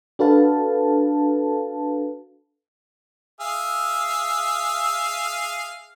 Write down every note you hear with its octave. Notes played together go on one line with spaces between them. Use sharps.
D4 F#4 A4 B4 F5 A5
G#4 E5 F5